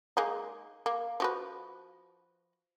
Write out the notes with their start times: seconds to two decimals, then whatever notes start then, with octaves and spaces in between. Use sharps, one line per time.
0.17 G#3 A#3 D#4
0.86 A#3
1.20 F3 F#4 B4